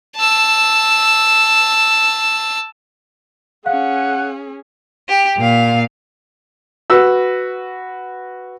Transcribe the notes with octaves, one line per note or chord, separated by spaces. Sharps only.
A5 E6
C#4 G#4 F5 F#5
G4
A#2 F5
F#4 B4 E6